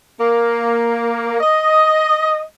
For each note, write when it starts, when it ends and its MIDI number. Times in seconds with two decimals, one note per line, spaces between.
0.20 1.40 58
1.40 2.41 75